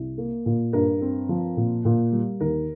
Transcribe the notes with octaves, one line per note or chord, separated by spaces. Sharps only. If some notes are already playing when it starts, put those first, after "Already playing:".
Already playing: C2
A#3
A#2
G2 A#4
C4
F3
A#2
A#2
G3
D#2 A#4